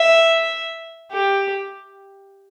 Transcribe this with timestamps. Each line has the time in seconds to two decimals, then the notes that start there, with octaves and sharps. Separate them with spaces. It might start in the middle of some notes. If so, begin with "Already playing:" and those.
Already playing: E5
1.11 G4